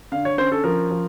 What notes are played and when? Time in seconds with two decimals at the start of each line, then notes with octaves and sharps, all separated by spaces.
0.12 D3 F5
0.25 C#5
0.38 C#4 C5
0.52 A4
0.64 F3 A#4
0.91 F3